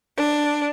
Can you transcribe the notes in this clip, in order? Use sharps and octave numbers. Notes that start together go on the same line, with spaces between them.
D4